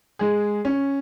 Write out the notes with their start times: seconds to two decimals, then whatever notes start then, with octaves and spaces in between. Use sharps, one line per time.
0.19 G#3 G#4
0.65 C#4